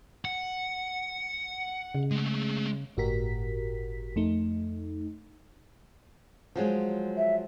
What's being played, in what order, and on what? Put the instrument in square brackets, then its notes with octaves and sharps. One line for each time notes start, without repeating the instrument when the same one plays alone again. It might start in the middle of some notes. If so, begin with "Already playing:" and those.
[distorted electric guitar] F#5
[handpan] C#3
[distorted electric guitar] G#3 A3
[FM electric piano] G1 A2 F#4 G4 A#4 B6
F2 A3 D#4
[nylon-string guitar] F3 F#3 G#3
[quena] E5